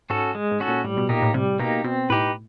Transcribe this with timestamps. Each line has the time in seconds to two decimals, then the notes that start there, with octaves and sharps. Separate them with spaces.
0.10 G#2 C#4 F#4 A4
0.35 G#3
0.51 G#2
0.60 C#4 F#4 A4
0.68 A#2
0.84 A2 G3
0.97 B2
1.09 A#2 A#3 D#4 G4
1.22 A2
1.34 C3 G3
1.59 B2 A#3 D#4 G4
1.84 B2 C4
2.10 A2 D#4 G4 B4